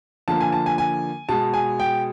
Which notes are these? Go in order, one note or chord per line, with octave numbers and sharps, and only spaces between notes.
D3 F3 A#3 A5
G#5
A5
G#5
G#5
B2 G#3 A5
G#5
G5